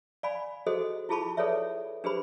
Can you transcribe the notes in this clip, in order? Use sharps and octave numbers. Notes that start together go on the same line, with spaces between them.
D5 F5 G#5 B5
F#4 G#4 A4 C5 D#5
E4 F4 G#4 A5 B5 C#6
G#4 A4 B4 C#5 D5 E5
D4 G4 G#4 B4 C5 B5